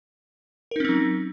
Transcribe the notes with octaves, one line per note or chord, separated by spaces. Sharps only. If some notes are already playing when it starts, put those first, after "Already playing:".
F#3 C4 C#4 D#4 A#4